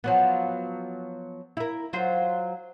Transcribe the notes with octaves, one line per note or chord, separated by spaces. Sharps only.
F3 F#3 B3
E4 A#4
F#3 F4 C5